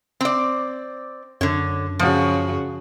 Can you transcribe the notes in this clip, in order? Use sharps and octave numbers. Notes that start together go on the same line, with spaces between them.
C4 D5
F#2 D3 C#5
C#3 F3 F#4